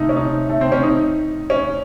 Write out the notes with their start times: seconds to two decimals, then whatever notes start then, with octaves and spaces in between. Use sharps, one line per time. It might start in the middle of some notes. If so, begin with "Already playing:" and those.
Already playing: C3 A3 D#4
0.09 C#4
0.17 D#4
0.49 A3
0.61 C4
0.72 C#4
0.83 D#4
1.50 C#4